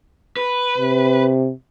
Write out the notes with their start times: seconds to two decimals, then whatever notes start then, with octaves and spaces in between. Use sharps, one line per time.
0.37 B4
0.78 C3